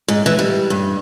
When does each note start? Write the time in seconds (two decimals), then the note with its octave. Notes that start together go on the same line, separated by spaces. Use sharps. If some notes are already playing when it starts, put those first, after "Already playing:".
0.08 G#2
0.26 E3
0.39 G3
0.70 G2